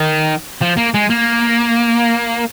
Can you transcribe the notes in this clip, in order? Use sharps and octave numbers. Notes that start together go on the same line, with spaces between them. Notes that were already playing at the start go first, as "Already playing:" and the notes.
Already playing: D#3
F3
A#3
G#3
A#3